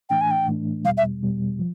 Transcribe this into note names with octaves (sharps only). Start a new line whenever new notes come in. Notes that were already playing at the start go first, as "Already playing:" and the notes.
A2 E3 A3 D4 G5
G#5
G5
A2 E3 A3 D4
E2 B2 G3 F5
E5
E2 B2 G3
F3